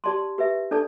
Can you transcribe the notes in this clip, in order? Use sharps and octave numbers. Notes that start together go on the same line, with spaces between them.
G4 D5 A5 C6
G4 B4 E5
D4 A4 D5 A5